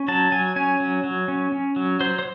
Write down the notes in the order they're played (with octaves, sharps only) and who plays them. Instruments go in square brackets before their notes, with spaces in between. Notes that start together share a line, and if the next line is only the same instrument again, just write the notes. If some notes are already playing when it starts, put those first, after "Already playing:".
Already playing: [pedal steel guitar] C#4
F#3 A5
F#3 G#5
C#4 G#5
F#3
F#3
C#4
C#4
F#3
F#3 C5
C5